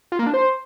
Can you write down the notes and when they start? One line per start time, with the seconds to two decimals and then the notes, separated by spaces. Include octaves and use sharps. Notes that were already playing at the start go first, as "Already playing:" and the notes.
0.12 F4
0.19 A#3
0.26 D4
0.34 C5